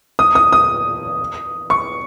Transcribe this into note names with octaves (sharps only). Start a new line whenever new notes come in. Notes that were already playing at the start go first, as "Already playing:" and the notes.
D#6
D#6
D#6
C#6